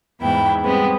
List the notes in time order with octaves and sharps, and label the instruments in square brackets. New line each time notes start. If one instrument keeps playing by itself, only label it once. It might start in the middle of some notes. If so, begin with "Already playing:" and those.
[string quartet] E2 G#2 B3 E4 G5
G3 G#3 B3 C4